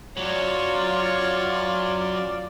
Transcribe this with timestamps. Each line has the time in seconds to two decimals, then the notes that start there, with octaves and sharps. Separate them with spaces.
0.17 F#2 F#3 F4 C#5 D5